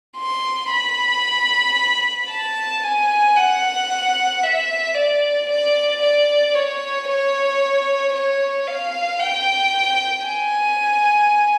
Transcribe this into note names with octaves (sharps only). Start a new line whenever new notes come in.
C6
B5
A5
G#5
F#5
E5
D5
D5
D5
C#5
C#5
C#5
F5
G5
G#5